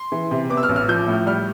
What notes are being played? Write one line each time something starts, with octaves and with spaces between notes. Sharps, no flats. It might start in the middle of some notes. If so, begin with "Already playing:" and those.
Already playing: C6
E3
C3
B3 D6
E6
F6
A1
F6
F3 G6
A2
G3 F6